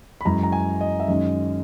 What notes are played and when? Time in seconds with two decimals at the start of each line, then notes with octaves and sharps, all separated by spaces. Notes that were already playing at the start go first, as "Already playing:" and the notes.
0.21 B5
0.25 F#2 E3 G#3 A#5
0.43 A#5
0.52 G#5
0.81 D#5
1.00 E5
1.08 F#2 D#3 G#3 C#4 D#5